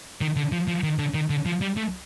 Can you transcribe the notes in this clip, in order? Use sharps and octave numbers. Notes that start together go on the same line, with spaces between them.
D#3
D3
F3
F3
D#3
D3
D#3
D3
F3
G3
A3